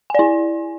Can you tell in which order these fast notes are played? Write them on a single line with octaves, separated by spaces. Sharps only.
G#5 D5 E4